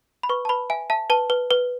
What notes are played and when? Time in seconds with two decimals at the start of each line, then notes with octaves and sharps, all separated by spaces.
0.23 B5
0.29 B4 C#6
0.45 A5
0.49 B4 B5
0.70 E5 G#5
0.90 E5 A5
1.10 B4 A5
1.30 B4
1.51 B4